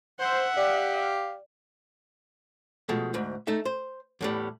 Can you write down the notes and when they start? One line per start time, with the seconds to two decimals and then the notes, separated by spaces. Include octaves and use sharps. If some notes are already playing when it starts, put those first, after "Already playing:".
0.19 C5 E5 F#5
0.57 G4 D5 F5
2.89 B2 F3 G#3 A3
3.14 D2 G#2
3.47 A3 D#4 E5
3.65 C5
4.21 E2 A2 G3